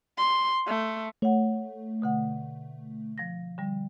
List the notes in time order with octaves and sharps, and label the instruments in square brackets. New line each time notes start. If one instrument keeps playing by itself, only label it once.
[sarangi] C6
A3
[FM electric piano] A3 [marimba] C#5 F#5
[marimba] B2 D3 F#5
F3 A#6
D3 G3